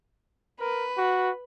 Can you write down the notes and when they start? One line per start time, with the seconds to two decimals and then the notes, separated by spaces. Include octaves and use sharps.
0.60 A#4 B4
0.98 F#4